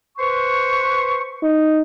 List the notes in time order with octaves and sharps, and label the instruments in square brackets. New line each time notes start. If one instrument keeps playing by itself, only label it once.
[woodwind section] B4 C5 C#6
[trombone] D#4